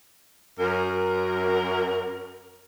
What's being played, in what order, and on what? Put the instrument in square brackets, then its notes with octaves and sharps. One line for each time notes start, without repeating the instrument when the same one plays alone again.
[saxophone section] F#2 A#4